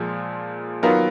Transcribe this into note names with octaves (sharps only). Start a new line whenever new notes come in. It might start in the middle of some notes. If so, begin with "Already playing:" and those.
Already playing: A#2 F3 G#3
D#3 F#3 B3 F4 A#4